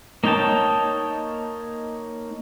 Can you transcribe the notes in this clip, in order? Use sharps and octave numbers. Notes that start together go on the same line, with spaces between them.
A#3 D#4 C#5 G5 A5